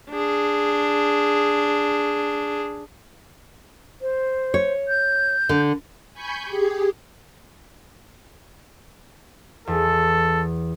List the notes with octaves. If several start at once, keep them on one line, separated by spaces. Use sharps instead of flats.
D4 G#4
C5
C#5
G6
D3
G#5 B5 C#6 G6
G4 G#4
E2 A4